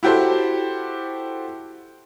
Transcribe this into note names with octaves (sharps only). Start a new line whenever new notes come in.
E4 F#4 G4 A4 C5